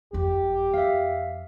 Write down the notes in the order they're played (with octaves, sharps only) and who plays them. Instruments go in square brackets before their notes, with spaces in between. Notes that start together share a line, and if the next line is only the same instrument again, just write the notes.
[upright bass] G1 F2 [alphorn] G4
[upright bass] F2 [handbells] E5 F5